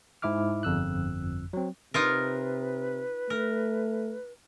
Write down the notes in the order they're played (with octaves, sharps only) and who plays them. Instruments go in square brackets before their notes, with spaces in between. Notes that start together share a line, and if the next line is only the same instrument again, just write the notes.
[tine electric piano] G#2 E4 E5 D6 F6
G1 F2 E6 F#6
F#3 C4
[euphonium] C3 [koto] D#4 F4 A#4 [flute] B4
[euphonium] A3 [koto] A#4